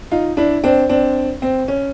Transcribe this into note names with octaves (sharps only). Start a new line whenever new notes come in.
D#4 F4
D4 E4
C4 D4
C4 D4
C4
C#4